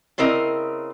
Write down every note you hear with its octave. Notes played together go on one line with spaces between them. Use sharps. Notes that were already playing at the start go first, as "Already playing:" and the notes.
C#3 C4 E4 A#4 D#5